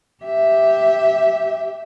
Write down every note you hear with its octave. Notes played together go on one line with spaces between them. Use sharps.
G4 E5